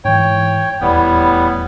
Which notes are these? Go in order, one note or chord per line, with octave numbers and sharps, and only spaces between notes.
G#2 E3 C#5 G5
D#1 E2 A2 G3 B3